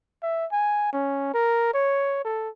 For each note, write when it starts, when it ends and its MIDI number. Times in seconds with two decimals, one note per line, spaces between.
0.23 0.46 76
0.52 0.89 80
0.93 1.33 61
1.34 1.72 70
1.74 2.20 73
2.25 2.49 69